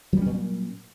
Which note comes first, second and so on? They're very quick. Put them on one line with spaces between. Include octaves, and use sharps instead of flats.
F#3 G3 C#4 A#2